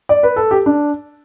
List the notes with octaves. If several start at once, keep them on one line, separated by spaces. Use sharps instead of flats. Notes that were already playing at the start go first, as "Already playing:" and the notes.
D5
B4
A4
G4
D4